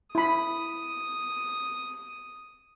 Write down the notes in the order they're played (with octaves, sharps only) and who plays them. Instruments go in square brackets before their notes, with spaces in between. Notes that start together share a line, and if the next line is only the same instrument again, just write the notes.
[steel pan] E4 B5 [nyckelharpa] D#6